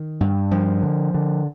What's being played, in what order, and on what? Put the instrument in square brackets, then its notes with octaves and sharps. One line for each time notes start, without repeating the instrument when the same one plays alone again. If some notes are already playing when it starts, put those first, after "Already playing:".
Already playing: [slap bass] D#3
G2
G2 F3
D3
D3